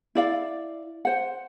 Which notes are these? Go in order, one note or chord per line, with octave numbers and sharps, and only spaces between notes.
E4 D5 F5
C5 F#5